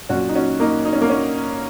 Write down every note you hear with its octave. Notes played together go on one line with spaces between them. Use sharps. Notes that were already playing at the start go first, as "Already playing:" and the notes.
A#2 F#3 C#4 F#4
D#4
C#4 F#4
A#3 D#4
D#4
C#4
A#3
C#4